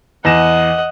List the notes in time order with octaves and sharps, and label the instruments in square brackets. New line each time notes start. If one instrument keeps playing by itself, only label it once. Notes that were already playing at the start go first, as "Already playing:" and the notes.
[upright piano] E2 A#6 E7 [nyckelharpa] D#5 F#5